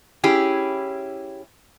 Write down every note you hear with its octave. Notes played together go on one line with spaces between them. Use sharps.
C#4 E4 G4 G#4